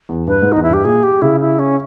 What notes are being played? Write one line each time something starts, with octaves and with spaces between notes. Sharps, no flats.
E2
G2 B4
G#2
E2 D#4
E4
G2 G4
A#2 G#4
G4
C#3 E4
E4
C#4